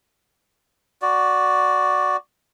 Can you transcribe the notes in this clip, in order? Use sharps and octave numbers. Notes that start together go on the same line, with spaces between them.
F#4 D5